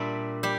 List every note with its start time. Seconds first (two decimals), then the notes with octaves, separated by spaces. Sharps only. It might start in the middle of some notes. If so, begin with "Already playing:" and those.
Already playing: A#2 G3 D4 D5 E5
0.43 G3 G4